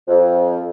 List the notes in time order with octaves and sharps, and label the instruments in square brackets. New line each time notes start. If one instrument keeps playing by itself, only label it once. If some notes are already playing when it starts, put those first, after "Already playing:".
[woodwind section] F2